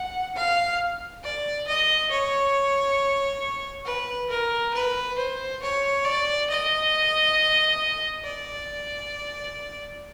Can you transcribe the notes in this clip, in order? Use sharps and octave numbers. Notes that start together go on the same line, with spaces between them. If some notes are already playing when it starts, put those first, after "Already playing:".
Already playing: F#5
F5
D5
D#5
C#5
B4
A#4
B4
C5
C#5
D5
D#5
D5